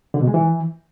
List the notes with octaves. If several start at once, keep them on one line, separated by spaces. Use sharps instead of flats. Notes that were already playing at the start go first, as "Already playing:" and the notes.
D3
B2
G#3
E3